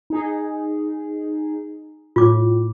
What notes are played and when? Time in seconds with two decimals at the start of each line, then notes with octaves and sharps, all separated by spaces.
0.10 D#4 G#4
2.16 A2 F4 D6